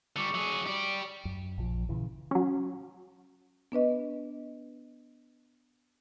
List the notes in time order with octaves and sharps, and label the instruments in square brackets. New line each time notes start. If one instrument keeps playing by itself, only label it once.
[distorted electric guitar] D3 G3 [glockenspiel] C#6 D6 C#7
[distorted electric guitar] F#3 G#4
G4 D5
[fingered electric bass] F#2
A#1 F3
A#2 C#3 E3
[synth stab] F#3 C#4
[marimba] B3 D4 B4 D#5